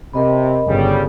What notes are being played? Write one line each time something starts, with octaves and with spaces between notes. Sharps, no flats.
C3 A#4 D#5 B5
G1 C#3 G3